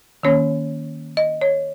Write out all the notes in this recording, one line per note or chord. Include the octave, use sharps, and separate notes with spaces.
D#3 A#3 C#4 C#5
D#5
C#5